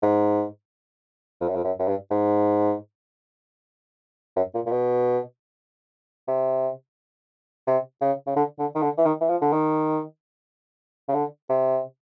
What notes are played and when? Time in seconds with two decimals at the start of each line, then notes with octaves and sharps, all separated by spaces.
0.02 G#2
1.41 F2
1.48 F#2
1.55 F2
1.64 F#2
1.79 F#2
1.88 G2
2.11 G#2
4.36 F#2
4.54 A#2
4.66 A#2
4.71 B2
6.28 C3
7.67 C3
8.01 C#3
8.26 C#3
8.36 D3
8.59 D3
8.75 D#3
8.82 D3
8.98 E3
9.05 D#3
9.21 E3
9.29 F3
9.41 D3
9.52 D#3
11.08 C#3
11.14 D3
11.49 C3